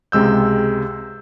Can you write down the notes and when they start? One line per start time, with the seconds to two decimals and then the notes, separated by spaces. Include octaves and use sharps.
0.12 C#2 C3 G#3 E6 G6